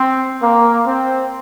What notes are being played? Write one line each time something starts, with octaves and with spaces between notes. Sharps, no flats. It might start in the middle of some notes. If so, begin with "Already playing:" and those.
Already playing: C4
A#3
C4